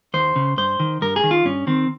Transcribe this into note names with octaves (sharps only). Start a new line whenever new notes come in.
D#2 C5
C#3
G2 C5
D#3
G2 A#4
G#4
D#3
F4
G2 C#4
D#3 C4